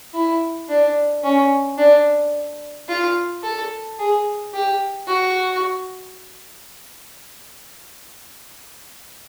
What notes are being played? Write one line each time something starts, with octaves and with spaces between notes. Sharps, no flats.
E4
D4
C#4
D4
F4
A4
G#4
G4
F#4